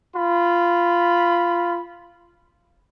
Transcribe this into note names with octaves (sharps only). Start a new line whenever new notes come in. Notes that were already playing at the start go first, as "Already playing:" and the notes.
F4 B5